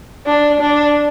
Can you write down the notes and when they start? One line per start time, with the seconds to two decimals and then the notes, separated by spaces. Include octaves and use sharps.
0.26 D4
0.60 D4